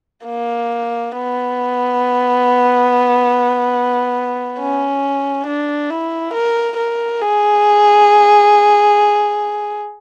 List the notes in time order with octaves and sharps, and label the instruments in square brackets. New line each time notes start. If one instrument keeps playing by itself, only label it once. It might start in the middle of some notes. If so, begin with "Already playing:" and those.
[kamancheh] A#3
B3
C#4
D4
E4
A#4
A#4
G#4